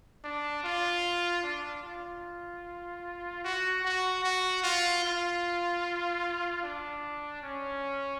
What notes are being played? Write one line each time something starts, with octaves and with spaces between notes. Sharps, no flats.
D4
F4
D4
F4
F#4
F#4
F#4
F4
F4
D4
C#4